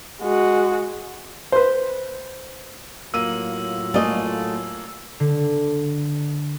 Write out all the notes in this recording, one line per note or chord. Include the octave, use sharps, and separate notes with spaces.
G#3 F#4
B4 C5
A2 F#3 A#3 F4 E6 D#7
A3 A#3 D#5 G#5
D3